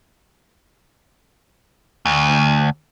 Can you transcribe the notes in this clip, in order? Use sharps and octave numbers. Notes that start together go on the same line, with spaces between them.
D2